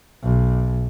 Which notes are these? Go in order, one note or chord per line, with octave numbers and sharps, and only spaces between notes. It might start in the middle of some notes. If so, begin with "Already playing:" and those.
B1